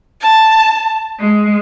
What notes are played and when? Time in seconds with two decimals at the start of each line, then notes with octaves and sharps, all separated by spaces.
0.20 A5
1.20 G#3